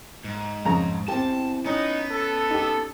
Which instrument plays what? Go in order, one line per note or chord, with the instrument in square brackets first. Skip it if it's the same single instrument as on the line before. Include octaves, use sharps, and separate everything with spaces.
[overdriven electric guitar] G#2
[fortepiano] F2 C#3 A#5
[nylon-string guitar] E2 C4 [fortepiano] G4 G5 [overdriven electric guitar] A5
[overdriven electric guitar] B3 [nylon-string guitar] C#4 [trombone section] D#4
[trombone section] A4
[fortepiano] D#4 G4